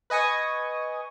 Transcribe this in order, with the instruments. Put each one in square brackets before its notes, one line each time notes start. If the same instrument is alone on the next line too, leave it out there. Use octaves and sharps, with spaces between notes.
[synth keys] B4 D#5 G#5 C#6 D#6